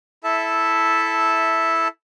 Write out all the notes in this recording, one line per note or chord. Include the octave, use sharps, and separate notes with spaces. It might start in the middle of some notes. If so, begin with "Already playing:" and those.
E4 A4 E5 A5